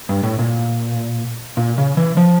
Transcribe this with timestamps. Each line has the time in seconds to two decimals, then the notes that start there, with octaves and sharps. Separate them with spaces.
0.09 G2
0.23 A2
0.39 A#2
1.57 A#2
1.78 C#3
1.97 E3
2.17 F3